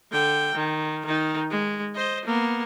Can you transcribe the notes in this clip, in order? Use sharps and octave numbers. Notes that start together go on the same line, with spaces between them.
D3 G5
D#3
D#3 D#4
G#3
C5 D#5
A#3 B3